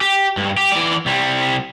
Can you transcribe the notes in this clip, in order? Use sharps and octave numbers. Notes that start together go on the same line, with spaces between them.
G4
G2
G4
E3 D5
C2 G3